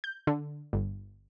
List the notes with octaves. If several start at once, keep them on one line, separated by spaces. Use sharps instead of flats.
G6
D3
G1